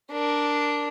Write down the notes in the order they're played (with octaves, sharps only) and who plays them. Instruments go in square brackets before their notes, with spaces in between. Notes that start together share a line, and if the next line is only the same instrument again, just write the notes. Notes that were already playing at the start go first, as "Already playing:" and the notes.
[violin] D4 A#4